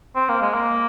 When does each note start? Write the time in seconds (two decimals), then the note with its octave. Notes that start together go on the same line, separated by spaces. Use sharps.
0.16 C4
0.29 A#3
0.42 G#3
0.54 A#3